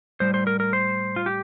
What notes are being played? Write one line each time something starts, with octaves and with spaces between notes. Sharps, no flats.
A2 G3 C5
C5
A#4
A#4
C5
F4
G4